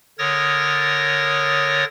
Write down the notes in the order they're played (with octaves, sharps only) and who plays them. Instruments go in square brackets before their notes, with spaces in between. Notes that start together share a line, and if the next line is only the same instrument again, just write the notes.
[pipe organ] D3 A#4 C#5 D#6 A6 A#6